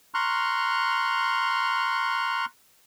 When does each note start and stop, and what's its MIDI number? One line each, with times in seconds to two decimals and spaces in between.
0.14 2.45 82
0.14 2.45 84
0.14 2.45 85
0.14 2.45 89
0.14 2.45 90